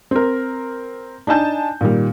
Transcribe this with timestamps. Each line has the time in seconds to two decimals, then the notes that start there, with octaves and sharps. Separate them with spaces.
0.11 C4 A#4
1.27 D4 D#4 G#5 A5 G6
1.81 A#2 D#3 G3